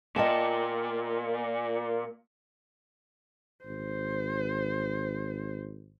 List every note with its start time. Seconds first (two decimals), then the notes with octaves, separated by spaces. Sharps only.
0.16 A#2 D#5 G5 A5
3.65 G#1 C5